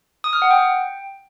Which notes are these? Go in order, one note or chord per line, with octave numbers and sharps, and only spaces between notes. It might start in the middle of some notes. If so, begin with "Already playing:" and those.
D#6
F6
F#5
G5